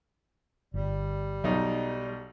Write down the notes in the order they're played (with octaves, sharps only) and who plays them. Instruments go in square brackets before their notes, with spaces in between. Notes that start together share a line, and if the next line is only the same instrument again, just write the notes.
[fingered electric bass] G1 [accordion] G3
[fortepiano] B1 D#4 [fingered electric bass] F#3